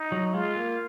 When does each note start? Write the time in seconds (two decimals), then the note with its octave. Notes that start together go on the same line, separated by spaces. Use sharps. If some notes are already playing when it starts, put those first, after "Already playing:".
Already playing: D#4
0.12 F#3
0.33 G#3 F4
0.56 A#3